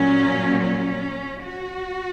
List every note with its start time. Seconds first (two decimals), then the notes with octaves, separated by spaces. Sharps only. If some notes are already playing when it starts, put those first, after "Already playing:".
Already playing: A#2 F#3 C#4
0.63 C#4
1.43 F#4